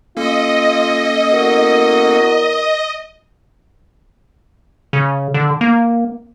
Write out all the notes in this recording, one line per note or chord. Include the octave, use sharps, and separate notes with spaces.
A#3 C#4 F4 A4 D#5
E2 F#4 A#4
C#3
D3
A#3